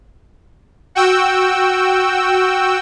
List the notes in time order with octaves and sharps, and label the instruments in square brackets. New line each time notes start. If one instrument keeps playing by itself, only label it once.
[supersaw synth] F#4 G5 E6